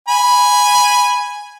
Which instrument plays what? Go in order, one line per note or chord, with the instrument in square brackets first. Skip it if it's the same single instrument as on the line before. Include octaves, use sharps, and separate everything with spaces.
[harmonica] G#5 B5